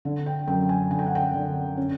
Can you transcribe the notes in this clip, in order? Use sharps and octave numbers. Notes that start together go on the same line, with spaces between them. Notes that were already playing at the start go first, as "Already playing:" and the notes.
D3
G5
F#2 G5
G#5
D3 G#5
G5
F#5
G5
D3
C#4